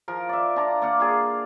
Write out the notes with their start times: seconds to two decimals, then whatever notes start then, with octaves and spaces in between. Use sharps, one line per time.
0.08 F3 A#4
0.29 D5 E5
0.56 D4 F4 A#5
0.82 A#3 D5 F5 F#5
1.00 F4 G#4 D5